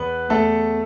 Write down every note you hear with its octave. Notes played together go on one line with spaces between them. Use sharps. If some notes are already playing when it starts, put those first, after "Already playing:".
Already playing: E2 B3 B4
E2 A3 A4